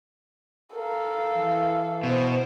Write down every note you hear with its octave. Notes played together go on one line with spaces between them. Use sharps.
A4 A#4 F5
E3
B2 C5